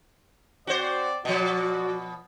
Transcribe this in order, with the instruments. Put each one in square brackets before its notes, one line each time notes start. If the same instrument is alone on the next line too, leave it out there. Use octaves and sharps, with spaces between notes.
[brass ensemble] C4 D5 [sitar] F#4 C5
[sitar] B2 F3 [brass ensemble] F#4 D5